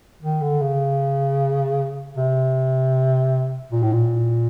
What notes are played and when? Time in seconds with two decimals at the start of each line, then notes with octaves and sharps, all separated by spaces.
0.23 D#3
0.42 D3
0.62 C#3
2.17 C3
3.72 A#2
3.83 A2
3.93 A#2